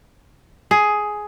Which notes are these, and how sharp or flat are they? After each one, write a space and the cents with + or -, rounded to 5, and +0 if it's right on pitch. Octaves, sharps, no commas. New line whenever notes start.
G#4 +10